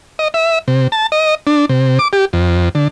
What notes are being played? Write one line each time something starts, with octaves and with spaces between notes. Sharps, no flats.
D#5
E5
C3
A5
D#5
D4
C3
D6
G4
F2
D3